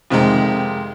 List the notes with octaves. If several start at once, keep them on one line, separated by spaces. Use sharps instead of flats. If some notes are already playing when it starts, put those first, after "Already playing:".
F2 C3 D#3 G#3